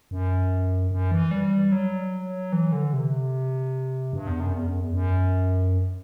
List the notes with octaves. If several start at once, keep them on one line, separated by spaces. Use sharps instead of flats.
F#2
F#2
E3
G3
F#3
E3
D3
C3
G2
E2
F#2
E2
F#2
E2
F#2